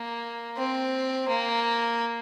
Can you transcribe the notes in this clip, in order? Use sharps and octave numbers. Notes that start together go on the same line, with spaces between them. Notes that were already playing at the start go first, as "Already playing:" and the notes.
Already playing: A#3
C4
A#3